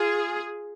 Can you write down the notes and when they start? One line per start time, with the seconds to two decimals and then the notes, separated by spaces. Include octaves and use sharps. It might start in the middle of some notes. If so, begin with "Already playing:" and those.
Already playing: F4 G#4